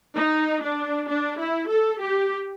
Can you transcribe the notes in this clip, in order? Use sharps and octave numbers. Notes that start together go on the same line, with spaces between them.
D#4
D4
D4
E4
A4
G4